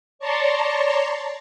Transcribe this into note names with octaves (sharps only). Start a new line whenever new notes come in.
C#5 D5 A5 A#5 C6 C#6